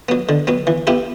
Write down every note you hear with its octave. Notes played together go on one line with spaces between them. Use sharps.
F#3 B3
D3
F#3 B3
E3
B3 E4 G4